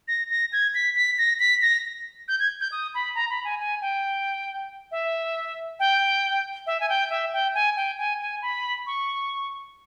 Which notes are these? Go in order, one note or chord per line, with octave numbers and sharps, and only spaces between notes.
A#6
A#6
G#6
B6
B6
A#6
B6
A#6
G6
G#6
G6
D#6
B5
A#5
B5
G#5
G#5
G5
E5
G5
E5
G#5
G5
E5
G5
G#5
G5
G#5
G#5
B5
C#6